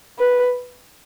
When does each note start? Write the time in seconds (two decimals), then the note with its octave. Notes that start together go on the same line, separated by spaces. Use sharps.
0.19 B4